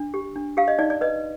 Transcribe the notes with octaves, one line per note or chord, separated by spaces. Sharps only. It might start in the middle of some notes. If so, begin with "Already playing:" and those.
Already playing: D4
G4
D4
G4 F5
D#5
D#4 D5
D5
B4 D#5